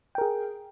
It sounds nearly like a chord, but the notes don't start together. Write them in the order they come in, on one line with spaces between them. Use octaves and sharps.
G5 A#4 G#4